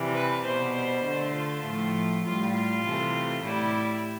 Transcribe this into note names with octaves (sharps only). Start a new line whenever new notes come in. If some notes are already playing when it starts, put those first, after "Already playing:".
Already playing: C3 E3 G3
B4
B2 G3 C5
C5
D3
A3
F4
A2 F3 A3
A2 G3 F4
F4
C3 E3 A3
A2 G3 E4